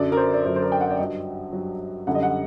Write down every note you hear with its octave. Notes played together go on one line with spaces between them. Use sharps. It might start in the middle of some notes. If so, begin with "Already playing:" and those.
Already playing: F#2 D3 F#3 D5
A#4
C5
D5
F#2 D3 F#3 C5
C5
A#4
G5
F#5
D5
G2 F#3 D#5
G2 F#3
F#2 D3 G3 F#5
D#5
F#5